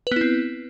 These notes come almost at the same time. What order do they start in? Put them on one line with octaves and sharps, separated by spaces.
B4 B3 E4 C4